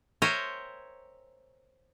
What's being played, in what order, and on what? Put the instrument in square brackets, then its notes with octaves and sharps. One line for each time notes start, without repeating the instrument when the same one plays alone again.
[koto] A#4 C5 C#5 E5 G5 G#5